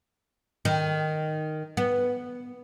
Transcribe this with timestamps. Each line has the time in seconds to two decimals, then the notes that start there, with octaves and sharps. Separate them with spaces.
0.65 D#3
1.77 B3